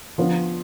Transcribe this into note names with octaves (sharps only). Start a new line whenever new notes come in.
F3 B3 D4 F4